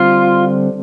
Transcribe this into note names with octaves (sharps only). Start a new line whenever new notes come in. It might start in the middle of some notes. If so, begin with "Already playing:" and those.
Already playing: D3 G3 C4 F4